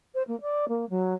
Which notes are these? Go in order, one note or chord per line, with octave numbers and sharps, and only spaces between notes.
C5
A#3
D5
A#3
F#3